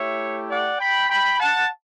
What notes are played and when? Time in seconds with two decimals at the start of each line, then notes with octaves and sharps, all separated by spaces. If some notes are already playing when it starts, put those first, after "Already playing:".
Already playing: A3 E4 G4 C#5 E5
0.49 D5 F#5
0.79 G5 B5
1.10 G5 B5
1.40 F#5 A5